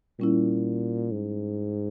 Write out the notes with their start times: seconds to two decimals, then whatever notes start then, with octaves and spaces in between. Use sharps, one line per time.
0.19 A#2 G3 C#4 E4
1.12 G#2